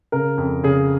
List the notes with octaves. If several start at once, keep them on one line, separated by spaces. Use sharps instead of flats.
C#3 A#4
F2
C#3 G#4